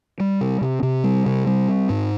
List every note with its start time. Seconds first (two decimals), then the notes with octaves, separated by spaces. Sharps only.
0.20 G3
0.41 C3
0.61 C3
0.82 C3
1.04 G3
1.26 C3
1.46 G3
1.68 C4
1.90 G#2